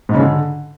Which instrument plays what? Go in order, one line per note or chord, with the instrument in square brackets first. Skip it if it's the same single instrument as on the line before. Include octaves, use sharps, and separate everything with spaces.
[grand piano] G#2
C#3
D3